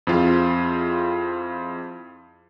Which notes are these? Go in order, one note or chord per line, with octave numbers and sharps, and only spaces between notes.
F2 C4 E4 F4 G#4 F5